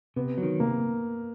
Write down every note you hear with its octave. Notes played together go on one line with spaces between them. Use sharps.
C3 B3
F#3
D#3
C3 A#3